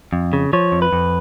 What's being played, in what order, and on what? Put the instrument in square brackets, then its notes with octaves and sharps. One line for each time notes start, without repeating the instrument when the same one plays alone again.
[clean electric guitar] F2
C#3
F3 C#5
F2
B4
F2